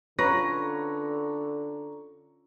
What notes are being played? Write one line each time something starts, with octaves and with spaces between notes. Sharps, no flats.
D3 C#4 F4 B4 C#5 A#5 C#6 A#6